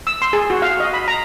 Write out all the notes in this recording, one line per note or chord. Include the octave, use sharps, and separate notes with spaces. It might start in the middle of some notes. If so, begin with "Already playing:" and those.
E6
C6
G#4
F#4
F5
D#5
B5
A#5